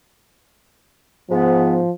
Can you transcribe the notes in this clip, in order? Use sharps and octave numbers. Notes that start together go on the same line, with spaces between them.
G#2 F3 B3